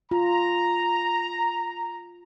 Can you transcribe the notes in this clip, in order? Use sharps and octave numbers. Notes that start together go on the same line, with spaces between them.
F4 A#5